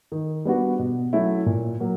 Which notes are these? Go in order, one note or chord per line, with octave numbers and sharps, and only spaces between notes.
D#3
G3 B3 D4 F#4
B2
F#3 A3 C#4 E4
A#2
F#3 A#3